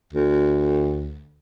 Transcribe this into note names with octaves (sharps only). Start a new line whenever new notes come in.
D2